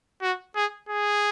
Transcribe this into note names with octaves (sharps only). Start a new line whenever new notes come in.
F#4
G#4
G#4